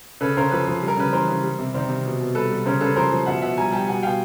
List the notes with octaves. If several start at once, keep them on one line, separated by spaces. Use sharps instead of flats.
C#3 A4 B4
C#3 A#4 C5
F3 A4 B4
F3
G3
A#4
C#3 B4
E3 A#4 C5
C#3
G3
C3
D#3 C5 D5
C3
B2
B2
G3 A4 B4
G3
C#3 A#4 C5
C#3 A4 B4
F3 A#4 C5
F3
B2 E5 F#5
B2 E5 F#5
G3 G#5 A#5
G3 G5 A5
B2 F#5 G#5
B2 F5 G5